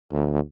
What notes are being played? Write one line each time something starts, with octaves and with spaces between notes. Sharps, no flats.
D2